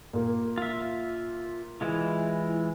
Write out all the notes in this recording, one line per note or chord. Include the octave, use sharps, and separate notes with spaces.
A#2 A#3
F4 E5
E3 G#3 E4 F4